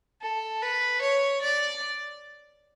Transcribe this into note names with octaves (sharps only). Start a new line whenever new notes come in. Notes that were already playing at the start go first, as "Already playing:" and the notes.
A4
B4
C#5
D5